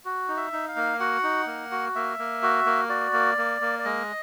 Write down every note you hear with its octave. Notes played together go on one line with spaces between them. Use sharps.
F#4
D#4
E5
D#4
F5
A#3
F#4 F#5
D#4
A#3
F#4
A#3 E5
A#3
F#4
A#3
F#4 D5
A#3
A#3
A#3
D5
G#3 D#5